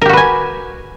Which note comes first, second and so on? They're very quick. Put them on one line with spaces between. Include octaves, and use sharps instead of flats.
A#4 G4 F#4 B4 G#5